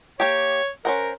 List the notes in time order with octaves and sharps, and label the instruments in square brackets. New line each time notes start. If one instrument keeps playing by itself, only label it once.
[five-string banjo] A#3 G4 [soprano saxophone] C#5
[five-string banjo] C#4 C5 F#5 [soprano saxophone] A#4